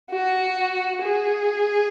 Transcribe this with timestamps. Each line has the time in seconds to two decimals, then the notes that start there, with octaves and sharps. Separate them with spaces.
0.10 F#4
1.02 G#4